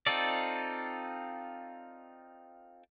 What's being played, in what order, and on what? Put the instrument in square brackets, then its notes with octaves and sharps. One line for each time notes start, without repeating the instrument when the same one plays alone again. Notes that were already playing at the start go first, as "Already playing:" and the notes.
[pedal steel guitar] C4 D#4 F4 A4 D5